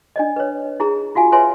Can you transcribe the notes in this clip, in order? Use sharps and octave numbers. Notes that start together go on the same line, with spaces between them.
D4 D5 D#5
B4 C#5
E4 G#4 A#5
F4 F#4 F5 G#5
B4 C#5 E5 G#5 C6